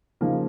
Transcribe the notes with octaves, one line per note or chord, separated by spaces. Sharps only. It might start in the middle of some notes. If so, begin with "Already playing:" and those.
C#3 F3 A#3 D#4